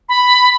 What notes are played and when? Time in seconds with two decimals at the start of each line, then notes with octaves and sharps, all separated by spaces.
0.09 B5